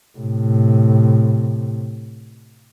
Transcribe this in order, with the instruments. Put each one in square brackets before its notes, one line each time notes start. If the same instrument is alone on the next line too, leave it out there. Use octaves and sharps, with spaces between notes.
[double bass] A2 C3